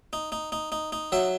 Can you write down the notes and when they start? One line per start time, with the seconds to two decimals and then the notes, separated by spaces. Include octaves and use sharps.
0.13 D#4
0.32 D#4
0.52 D#4
0.72 D#4
0.92 D#4
1.12 F#3 E5